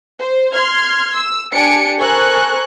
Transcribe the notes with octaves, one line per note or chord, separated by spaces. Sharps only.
C5
C6 F6 G#6
E6
D4 G4 G#5 C#7 D7
A4 A#4 C5 G#5 C#6 F#6